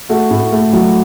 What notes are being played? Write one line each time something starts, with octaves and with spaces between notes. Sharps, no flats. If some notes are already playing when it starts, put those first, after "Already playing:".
A3 F#4
A2
A3
F#3